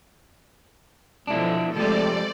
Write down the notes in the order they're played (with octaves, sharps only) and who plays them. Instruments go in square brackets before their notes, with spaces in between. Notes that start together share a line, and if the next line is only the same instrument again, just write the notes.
[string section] B2 D3 F3 [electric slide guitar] D4 E4
[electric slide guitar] F3 G4 [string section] G#3 C4 A4 [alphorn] A3 [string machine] D5